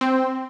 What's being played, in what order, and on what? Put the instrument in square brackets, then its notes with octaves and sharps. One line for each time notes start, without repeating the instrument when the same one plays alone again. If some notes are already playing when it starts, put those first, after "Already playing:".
[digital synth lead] C4